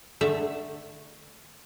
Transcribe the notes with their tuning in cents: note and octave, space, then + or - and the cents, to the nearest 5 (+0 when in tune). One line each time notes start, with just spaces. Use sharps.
D3 +25 A3 +0 E5 +0